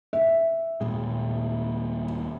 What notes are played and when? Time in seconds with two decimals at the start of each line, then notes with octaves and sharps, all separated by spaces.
0.13 E5
0.81 D#1 A#2 G#3